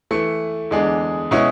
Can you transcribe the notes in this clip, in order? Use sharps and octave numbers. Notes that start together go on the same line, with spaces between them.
E3 A3 E4
E2 D3 G#3 D4 G#4
B2 G#3 C#4 E4